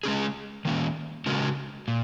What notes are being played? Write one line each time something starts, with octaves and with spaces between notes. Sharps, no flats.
G#3 C#4 G#4
D#3 A#3 C#4
C#3 G#3 C#4 F#4 A#4
A#2